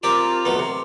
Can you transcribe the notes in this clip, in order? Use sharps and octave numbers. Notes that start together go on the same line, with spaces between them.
C4 F4 G4 A#4 D5 A#5
B1 A3 B3
C3